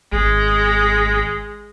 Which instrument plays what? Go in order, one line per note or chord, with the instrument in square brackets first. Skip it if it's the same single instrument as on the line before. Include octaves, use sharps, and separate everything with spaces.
[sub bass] G#1 [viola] G#3